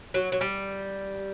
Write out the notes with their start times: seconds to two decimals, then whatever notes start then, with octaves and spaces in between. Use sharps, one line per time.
0.14 F#3
0.32 F#3
0.41 G3